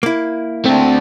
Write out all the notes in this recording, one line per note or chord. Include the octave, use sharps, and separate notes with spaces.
A#3 E4
A3 C4 D4